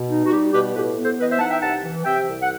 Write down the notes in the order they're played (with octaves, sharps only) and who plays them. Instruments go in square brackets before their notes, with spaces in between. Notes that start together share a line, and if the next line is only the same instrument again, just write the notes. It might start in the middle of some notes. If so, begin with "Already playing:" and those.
Already playing: [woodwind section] B2
D#4
F#4
G3 G4
B2 G4 B4
A2 G4 B4
B3
A4 C5
E3 B4 D#5
C5 E5
D#4 F#5 A5
E5 G5
C2 F#5 A5
E3
C3 E5 G5
C2
F#5